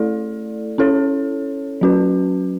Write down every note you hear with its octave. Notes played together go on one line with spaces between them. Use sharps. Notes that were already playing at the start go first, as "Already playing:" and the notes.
Already playing: A3 E4 A4 D5
C#4 E4 A4 C#5
F#3 C#4 F#4 B4